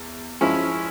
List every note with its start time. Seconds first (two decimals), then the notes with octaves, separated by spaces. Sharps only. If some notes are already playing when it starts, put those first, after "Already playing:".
Already playing: E2
0.41 F3 G#3 C#4 E4